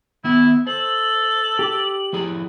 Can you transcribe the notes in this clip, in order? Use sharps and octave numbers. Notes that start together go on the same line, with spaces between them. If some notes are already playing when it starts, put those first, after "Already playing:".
D#3 B3 E4
A4 C5 F#7
G4 D6
F3 E4 G#4